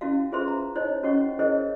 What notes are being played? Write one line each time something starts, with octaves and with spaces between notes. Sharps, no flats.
C#4 E4 F#4 F5
F4 G#4 B4 C5 E5 C6
A#5
D#4 E4 C5 C#5 D#5
C#4 F#4 D#5 F#5 C#6
E4 G#4 A#4 C5 C#5 D#5